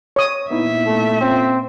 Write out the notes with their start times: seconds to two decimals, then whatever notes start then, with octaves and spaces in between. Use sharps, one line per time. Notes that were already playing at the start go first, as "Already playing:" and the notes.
0.16 C#5 D#6
0.51 A#2 B3 D#4 E4 E5
0.87 A3
1.21 C4 C#4 F4